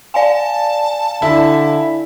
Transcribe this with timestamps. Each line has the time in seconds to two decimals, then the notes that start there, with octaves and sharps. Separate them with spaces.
0.14 D5 F5 G#5 A5
1.22 D3 E4